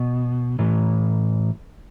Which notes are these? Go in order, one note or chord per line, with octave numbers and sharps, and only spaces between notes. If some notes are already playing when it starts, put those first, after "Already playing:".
Already playing: B2
A2 E3